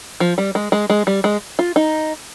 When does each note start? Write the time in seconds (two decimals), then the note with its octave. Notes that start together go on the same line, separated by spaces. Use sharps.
0.20 F3
0.38 G3
0.55 G#3
0.72 G#3
0.90 G#3
1.07 G3
1.24 G#3
1.59 F4
1.76 D#4